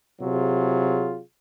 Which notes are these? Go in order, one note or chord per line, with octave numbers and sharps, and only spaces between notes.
C3 F#3 F4 G#4